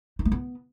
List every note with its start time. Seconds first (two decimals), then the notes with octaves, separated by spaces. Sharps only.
0.19 D#4
0.25 A3
0.32 B3